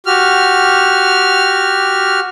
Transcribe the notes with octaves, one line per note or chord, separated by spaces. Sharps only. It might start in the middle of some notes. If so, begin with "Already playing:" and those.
F#4 G4 F6